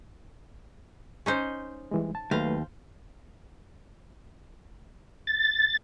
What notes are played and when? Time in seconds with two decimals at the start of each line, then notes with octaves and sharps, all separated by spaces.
1.26 C#4 D#4 C5
1.91 E3 G3 G#3
2.15 A5
2.31 D#2 F#3 A3 B4 C5 F5
5.27 A6